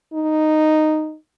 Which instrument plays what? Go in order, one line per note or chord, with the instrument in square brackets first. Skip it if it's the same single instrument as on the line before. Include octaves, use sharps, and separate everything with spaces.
[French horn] D#4